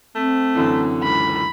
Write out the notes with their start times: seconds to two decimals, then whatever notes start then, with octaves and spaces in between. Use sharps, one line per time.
0.15 A3 C4
0.55 F#2 D3 E3
1.03 C#2 B5